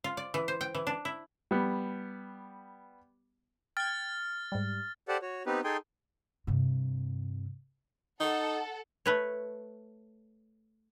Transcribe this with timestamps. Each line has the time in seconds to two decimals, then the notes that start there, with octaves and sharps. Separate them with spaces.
0.04 F4
0.17 D5
0.34 E3
0.48 C5
0.61 G5
0.75 E3
0.87 D4
1.05 E4
1.51 G3 B3
3.77 G5 F6 G#6 A6
4.52 G#2 G3
5.08 G4 A4 C5 D5 F#5
5.22 F#4 C#5
5.46 B3 C4 D#4 G4 B4
5.64 D#4 G#4 A4 G5 G#5 C6
6.47 G2 C3
8.20 D#4 A4 F#5
9.06 A3 B4 C#5